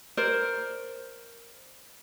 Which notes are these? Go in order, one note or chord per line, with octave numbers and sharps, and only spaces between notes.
A#4 C5 D5